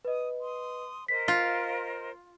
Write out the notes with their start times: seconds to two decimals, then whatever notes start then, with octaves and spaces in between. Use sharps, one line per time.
0.05 B4 D#5 D#6
0.41 C6 D#6
1.08 A#4 C5 D#5 B6
1.28 F4